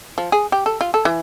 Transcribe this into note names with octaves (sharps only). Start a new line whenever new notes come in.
F3
G#4
G4
A4
F4
A4
E3